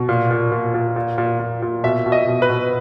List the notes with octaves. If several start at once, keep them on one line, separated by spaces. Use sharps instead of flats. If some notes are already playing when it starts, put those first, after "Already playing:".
Already playing: B2
A#2
A#2
A#2
A#2
A#2
A#2
A#2
A#2
B2 E5
B2
D#5
B2
B4
B2